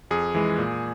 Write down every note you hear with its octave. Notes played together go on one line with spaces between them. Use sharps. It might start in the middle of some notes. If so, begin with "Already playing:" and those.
F2 G#4
E3 G#3
A#2